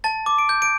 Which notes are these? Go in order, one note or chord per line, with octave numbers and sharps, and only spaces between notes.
A5 A6
D6
D7
G6
D7